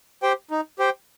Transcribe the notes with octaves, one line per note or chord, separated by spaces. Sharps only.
G4 C5 G5
D#4
G4 C5 G5